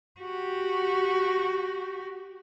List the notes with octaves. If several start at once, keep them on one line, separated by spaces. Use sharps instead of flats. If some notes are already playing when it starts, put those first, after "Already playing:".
F#4 G4